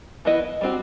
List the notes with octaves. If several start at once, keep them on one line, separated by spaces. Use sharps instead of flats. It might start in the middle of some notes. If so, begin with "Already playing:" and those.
E3 B3 E4 B4 D#5
G3 C4 F#4